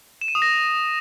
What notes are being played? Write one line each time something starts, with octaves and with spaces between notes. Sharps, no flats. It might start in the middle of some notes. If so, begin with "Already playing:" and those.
E7
D#7
D#6
A#6